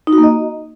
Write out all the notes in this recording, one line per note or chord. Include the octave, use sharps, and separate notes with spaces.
D#4
F#4
A#3
D#5